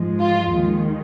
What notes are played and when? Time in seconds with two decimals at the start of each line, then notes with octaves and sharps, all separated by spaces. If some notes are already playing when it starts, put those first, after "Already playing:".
Already playing: G#2 F3 G#3
0.19 F4
0.51 D#2 D#3 G#3